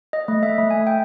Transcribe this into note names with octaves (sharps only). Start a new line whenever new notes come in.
D#5
A3
E5
A3
G#5
G5